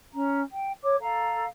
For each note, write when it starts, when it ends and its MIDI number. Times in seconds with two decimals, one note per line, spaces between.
0.12 0.40 61
0.12 0.40 82
0.50 0.71 79
0.81 0.95 73
0.81 0.95 86
1.00 1.44 69
1.00 1.44 77
1.00 1.44 82